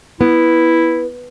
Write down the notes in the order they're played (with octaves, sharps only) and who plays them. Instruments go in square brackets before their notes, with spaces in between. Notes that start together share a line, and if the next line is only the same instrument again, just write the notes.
[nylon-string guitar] B3 [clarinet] E4